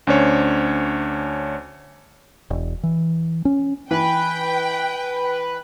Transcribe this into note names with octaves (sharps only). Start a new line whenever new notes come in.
D2 C#4 D4 C5 C#5
E1
E3
C#4
E3 B4 G5 B5